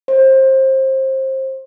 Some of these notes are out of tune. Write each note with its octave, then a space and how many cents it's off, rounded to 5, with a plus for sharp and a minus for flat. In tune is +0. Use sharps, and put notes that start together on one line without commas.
C5 +25